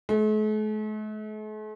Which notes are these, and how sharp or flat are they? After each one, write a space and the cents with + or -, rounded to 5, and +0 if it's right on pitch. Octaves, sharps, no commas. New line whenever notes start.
A3 -45